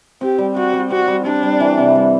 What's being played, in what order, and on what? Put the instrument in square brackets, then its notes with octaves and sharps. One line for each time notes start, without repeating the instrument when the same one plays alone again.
[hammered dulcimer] C4 [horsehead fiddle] G4
[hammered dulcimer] G3
[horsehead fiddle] F#4 [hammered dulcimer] G4
[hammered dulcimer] G3
[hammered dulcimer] C4 [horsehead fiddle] F#4
[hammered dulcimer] G3
[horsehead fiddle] D4 [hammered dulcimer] G4
[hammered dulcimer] G3
E3
C3
G3